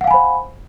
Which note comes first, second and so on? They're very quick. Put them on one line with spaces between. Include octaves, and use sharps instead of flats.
F#5 F5 G#5 B5 C5